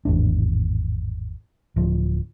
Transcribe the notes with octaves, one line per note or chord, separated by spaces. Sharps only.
G#1 E2 A2 D4
D1 F3